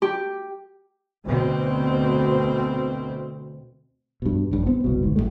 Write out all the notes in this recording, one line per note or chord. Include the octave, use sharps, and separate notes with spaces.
G4
D2 B2 C4
G2 B2
A1 G2
B3 C4
F#1 C2 B2
G1 G#2
A1 A2 G3 A3